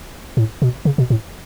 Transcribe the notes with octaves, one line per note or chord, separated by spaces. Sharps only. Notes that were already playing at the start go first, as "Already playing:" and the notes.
A2
B2
C#3
B2
A2